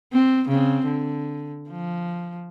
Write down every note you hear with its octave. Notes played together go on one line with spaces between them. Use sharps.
C4
C#3 C4
D3
F3